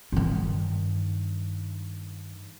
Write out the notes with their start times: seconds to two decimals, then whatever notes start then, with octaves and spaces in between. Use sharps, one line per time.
0.12 G2 D#3